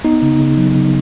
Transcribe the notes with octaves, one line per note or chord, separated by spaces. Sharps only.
B3 D#4
C#3
C#3
F#3
C#3